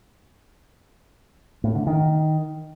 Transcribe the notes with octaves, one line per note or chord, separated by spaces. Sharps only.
A2
D3
D#3